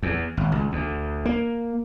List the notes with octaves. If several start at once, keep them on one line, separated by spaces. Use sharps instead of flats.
E2
G#1
C#2
D2
A#3